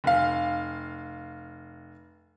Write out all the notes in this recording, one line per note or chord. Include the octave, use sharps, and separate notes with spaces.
F1 F5